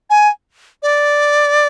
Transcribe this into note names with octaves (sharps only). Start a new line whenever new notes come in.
G#5
D5